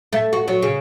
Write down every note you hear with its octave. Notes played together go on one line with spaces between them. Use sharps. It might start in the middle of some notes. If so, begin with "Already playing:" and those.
A3
F#4
F#3
C#3